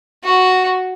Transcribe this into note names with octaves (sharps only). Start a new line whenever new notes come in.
F#4